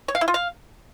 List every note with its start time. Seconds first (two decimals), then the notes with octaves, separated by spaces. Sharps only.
0.08 C#5
0.15 F5
0.21 E4
0.28 F4
0.34 F5